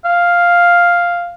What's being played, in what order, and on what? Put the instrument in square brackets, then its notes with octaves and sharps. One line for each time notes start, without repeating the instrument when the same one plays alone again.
[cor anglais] F5